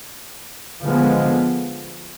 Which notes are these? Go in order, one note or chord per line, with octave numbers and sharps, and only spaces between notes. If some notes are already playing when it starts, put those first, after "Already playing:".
D3 F3 G#3 B3